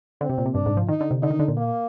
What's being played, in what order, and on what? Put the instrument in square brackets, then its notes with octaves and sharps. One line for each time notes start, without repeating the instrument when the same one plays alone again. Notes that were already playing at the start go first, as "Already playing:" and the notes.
[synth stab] D3 [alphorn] C4
[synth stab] C3
A#2
C3
[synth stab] G2 [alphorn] D4
[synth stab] G#2
F3
[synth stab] D#3 [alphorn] D#4
[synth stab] D3
C3
[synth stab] D3 [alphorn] D#4
[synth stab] D#3
D3
A#2
[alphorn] A#3